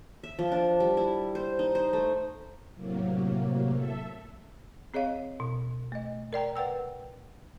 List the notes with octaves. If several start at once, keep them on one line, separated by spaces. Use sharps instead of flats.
E5
F3
D4
G3
E4
C5
D#4
C5
A3
A2 C3 F#3 A#3
A4 E5
C4 G#4 C#5 D#5 F5
B2
A3 D#5
A#4 D5 G5 A#5
B4 F#5 G5 E6